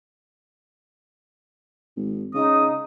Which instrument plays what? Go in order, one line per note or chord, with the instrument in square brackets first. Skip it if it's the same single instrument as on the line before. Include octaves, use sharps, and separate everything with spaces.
[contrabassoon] G#1
[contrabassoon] C#3 [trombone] D#4 [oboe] D#6